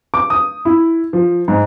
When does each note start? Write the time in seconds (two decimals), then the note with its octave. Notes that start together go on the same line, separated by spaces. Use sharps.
0.14 D6
0.30 D#6
0.65 E4
1.13 F3
1.48 G#2